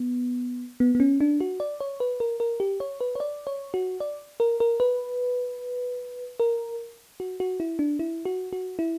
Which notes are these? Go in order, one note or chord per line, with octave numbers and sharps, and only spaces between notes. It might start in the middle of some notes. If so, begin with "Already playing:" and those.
Already playing: B3
B3
B3
C#4
D4
F#4
D5
C#5
B4
A#4
A#4
G4
C#5
B4
C#5
D5
C#5
F#4
D5
A#4
A#4
B4
A#4
F#4
F#4
E4
D4
E4
F#4
F#4
E4